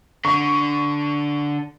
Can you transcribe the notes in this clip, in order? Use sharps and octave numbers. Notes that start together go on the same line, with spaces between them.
D3 C#6